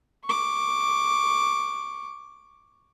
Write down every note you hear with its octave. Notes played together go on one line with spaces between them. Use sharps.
C#6 D6